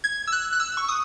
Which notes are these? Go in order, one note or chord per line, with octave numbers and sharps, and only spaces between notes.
G#6
E6
F#6
F#6
E6
C#6
D#6